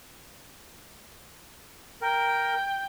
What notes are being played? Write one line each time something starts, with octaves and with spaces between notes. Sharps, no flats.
A#4 G5